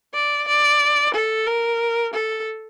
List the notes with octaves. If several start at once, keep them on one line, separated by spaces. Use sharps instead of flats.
D5
D5
A4
A#4
A4